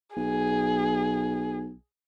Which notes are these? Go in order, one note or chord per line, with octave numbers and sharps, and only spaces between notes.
B1 G#4